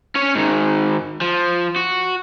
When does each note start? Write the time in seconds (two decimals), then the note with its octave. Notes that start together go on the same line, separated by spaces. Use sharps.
0.15 C#4 C#5
0.35 G#2 D#3
1.21 F3
1.76 F#4